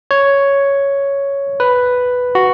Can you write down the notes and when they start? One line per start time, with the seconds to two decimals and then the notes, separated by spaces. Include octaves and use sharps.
0.11 C#5
1.60 B4
2.35 F#4